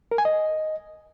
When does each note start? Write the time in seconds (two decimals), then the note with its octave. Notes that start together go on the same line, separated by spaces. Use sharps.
0.11 A#4
0.18 G#5
0.25 D#5